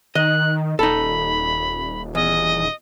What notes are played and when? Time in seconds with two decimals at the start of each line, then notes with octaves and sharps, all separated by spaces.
0.15 D#3 D#5 F#6
0.79 D#1 D#4 A4 B5
2.15 E2 D#5